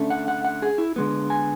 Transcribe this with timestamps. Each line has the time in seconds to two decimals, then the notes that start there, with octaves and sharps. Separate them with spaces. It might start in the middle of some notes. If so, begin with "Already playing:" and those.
Already playing: D3 A3 C#4
0.10 F#5
0.28 F#5
0.45 F#5
0.62 G#4
0.78 E4
0.96 D3 G#3 B3
1.30 G#5